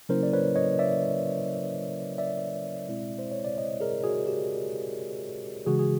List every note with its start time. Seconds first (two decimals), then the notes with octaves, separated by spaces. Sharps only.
0.09 C#3 F#3 A#3 C#4 E4 A#4 C5
0.23 D5
0.33 B4 C#5
0.56 C#5 D#5
0.79 D5 E5
2.18 D5 E5
2.88 B2 G#3 C4 E4
3.19 C5
3.32 C#5
3.45 D5
3.58 C#5 D#5
3.80 G#4 A#4
4.04 F#4 G#4
4.27 G4
5.66 C#3 E3 G#3 F#4 G#4
5.79 G#4